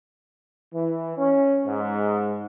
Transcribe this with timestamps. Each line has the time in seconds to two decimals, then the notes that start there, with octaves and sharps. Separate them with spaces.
0.75 E3
1.17 C#4
1.66 G#2